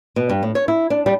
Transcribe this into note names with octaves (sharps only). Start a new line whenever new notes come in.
B2
G2
A2
C#5
E4
D4
G3